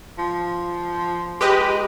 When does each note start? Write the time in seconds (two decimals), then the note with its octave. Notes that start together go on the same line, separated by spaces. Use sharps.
0.18 F3
1.41 G#3 G4 B4 D#5